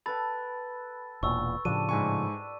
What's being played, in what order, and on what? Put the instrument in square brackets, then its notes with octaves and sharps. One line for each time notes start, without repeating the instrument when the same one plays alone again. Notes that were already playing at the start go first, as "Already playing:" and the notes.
[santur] A4 B4 G5 [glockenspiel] B5 A6
[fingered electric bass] E1 A#2 [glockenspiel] C#6 E6
[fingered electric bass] A2 C#3 F3 [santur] G3 D4 [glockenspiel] D#7
[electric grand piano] G#2 G#5 C#6 [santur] E4